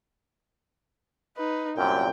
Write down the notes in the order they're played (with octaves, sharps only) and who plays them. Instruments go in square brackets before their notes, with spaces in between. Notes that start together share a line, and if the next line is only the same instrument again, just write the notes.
[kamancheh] D#4 B4
[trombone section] C2 F#2 A#2 [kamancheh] G5